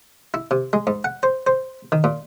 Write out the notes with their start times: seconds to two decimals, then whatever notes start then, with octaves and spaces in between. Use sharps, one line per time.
0.34 E4
0.51 C3
0.73 G#3
0.87 G#2
1.04 F#5
1.23 C5
1.47 C5
1.92 D#3
2.04 A#2